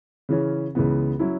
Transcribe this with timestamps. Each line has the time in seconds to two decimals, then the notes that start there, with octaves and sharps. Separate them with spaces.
0.29 C#3 E3 C#4
0.75 C#2 C#3 E3 B3
1.19 F#3 C#4 E4